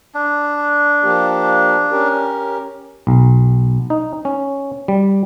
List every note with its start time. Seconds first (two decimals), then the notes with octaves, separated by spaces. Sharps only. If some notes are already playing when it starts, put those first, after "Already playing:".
0.14 D4
1.03 F3 A#3 G4
1.91 C#4 G4 A#4
3.07 B1
3.90 D#4
4.25 C#4
4.88 G3